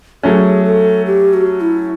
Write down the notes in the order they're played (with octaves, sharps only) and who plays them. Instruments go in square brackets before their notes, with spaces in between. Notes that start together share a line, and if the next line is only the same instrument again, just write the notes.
[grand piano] F#3 A3 C#4 [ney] G#4
[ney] A4
G4
F#4
E4